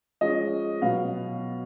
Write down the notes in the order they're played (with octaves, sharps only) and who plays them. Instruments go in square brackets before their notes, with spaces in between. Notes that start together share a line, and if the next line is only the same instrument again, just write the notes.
[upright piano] F3 G#3 C#4 D#5
B2 F#3 B3 F5